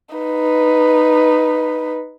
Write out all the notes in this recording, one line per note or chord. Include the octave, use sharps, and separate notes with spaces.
D#4 B4